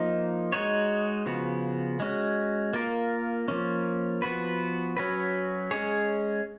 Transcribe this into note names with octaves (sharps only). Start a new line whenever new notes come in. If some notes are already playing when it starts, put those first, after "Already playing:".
Already playing: F3 A#3 D#4
G#3 D#4 F#4 C#5
C#3 F3 B3 F#4
G#3 C#4 F#4
A#3 F4 A#4
F3 A#3 C#4
F3 B3 F#4 B4
F#3 C#4 F#4 B4
G#3 C#4 G#4 C#5